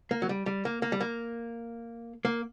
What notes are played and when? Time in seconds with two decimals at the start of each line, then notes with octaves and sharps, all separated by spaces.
0.11 A#3
0.22 F#3
0.29 G3
0.46 G3
0.65 A#3
0.82 A#3
0.92 G3
1.01 A#3
2.25 A#3